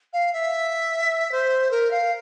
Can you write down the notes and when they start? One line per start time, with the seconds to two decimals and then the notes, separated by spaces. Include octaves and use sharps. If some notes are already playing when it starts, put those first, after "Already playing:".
0.13 F5
0.33 E5
1.32 C5
1.71 A#4
1.91 F5